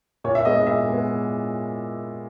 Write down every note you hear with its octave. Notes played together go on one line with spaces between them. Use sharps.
A#2 C#5
E5
G#3 B3 D#5
D#5
A#2 E5
G#3 B3